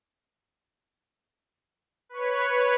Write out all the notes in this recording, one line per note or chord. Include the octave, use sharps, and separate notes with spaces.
B4 C#5